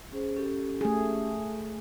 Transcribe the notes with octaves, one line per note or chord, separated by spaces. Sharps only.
C#4 G#4 C5
C#4 G4 A4
A3 G#4